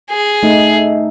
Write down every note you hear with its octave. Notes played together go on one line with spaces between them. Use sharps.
G#4
A3 D#4